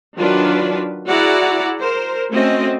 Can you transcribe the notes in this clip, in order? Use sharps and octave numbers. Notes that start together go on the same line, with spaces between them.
D#3 F#3 D4 F4 F#4 B4
E4 F#4 G#4 D5 F#5 A#5
A#4 C5
A3 C4 C#4 F#4 D#5